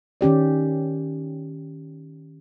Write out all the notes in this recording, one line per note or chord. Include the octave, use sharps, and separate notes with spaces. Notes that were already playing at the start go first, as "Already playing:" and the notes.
D#3 C#4 G4 D5